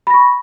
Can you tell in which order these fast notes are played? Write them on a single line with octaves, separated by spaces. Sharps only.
B5 A#6 C#6